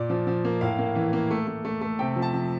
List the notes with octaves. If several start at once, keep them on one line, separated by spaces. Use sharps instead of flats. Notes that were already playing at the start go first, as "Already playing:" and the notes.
Already playing: A#2 D5
F3
F3
A#3
A2 F5
A#3
E3
A#3
A3
A3
A3
A3
C3 G5
F3
A5
F3